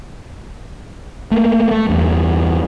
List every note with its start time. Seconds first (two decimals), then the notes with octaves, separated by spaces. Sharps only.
1.31 A3 A#3
1.71 A3
1.88 E2 G2